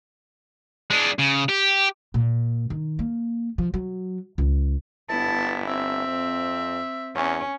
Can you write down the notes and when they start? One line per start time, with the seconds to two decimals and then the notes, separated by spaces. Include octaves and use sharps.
0.90 G#3 D4
1.19 C#3
1.49 G4
2.14 A#2
2.70 D#3
2.99 A#3
3.58 F3
3.74 F#3
4.38 C#2
5.09 G1 B3 E4 A5
5.68 C4 E5
6.07 F2
7.15 E2 C#4